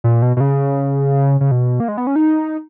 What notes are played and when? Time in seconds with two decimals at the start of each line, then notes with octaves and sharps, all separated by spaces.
0.04 A#2
0.22 B2
0.37 B2
0.40 C#3
1.41 C#3
1.51 B2
1.80 A#3
1.88 G#3
1.98 B3
2.07 C#4
2.16 D#4